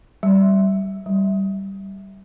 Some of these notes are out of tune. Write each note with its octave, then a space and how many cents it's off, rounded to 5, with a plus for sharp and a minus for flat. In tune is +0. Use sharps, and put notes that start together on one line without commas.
G3 -15
G3 -10